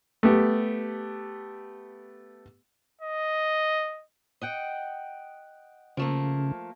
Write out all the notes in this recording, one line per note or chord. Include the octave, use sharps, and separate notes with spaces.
A3 B3 G4
D#5
D#5 F#5 G5
C#3 F3 A3 A#3